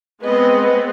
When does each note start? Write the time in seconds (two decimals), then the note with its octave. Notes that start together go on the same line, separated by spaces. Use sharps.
0.22 G#3 B3 C4 B4 D#5